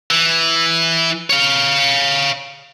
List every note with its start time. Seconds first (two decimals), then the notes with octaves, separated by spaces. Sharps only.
0.11 E3
1.30 C#5 F5